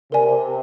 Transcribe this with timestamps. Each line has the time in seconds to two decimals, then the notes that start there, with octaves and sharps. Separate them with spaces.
0.12 C3 A#4 D5 G#5